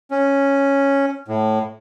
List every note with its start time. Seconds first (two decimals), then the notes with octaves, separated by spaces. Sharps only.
0.11 C#4
1.28 A2